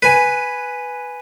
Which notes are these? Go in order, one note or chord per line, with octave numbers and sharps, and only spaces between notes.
B4 G#5